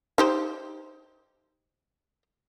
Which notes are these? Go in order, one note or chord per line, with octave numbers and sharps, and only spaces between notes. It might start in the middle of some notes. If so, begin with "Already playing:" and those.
D#4 G4 C5